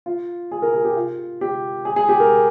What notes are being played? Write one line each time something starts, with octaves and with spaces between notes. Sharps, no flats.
F4
G#4
A#4
G#4
G4
F4
G4
G#4
G#4
G4
A#4